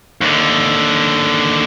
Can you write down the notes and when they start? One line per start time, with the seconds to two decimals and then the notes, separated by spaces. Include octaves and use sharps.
0.21 D#2 D3